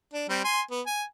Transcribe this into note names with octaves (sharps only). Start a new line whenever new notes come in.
D4
G3 C4
G#5 C6
B3
G#5